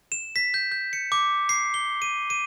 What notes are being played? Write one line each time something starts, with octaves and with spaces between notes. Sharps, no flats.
E7
B6
G6
G6
C#7
D6
C7
G7
D#7
D#7